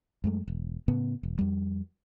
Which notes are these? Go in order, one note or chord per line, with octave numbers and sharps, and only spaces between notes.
F#2 G#3 A3
E1
A2 C#3 B3
E1
F2 G3